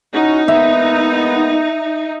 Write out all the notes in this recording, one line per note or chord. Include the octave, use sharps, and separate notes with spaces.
C#4 D#4 E4 F#4
G#3 A#3 B3 E5